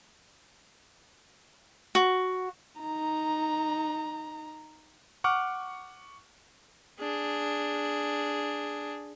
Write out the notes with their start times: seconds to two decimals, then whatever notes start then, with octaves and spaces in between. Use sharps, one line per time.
1.95 F#4
2.81 D#4 A#5
5.24 F#5 C#6 D6 F6
7.00 D4 G#4